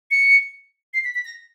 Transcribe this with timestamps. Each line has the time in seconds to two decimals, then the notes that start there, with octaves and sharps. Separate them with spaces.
0.11 C#7
0.94 C7
1.04 B6
1.15 B6
1.25 A#6